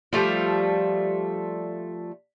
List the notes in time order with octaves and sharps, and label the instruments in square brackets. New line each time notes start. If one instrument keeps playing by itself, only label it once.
[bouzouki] F3 G3 A3 F4